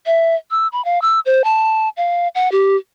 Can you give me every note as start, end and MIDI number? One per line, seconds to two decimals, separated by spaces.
0.06 0.35 76
0.51 0.68 88
0.72 0.84 83
0.85 1.01 77
1.02 1.20 88
1.26 1.42 72
1.44 1.89 81
1.97 2.28 77
2.35 2.51 78
2.52 2.76 67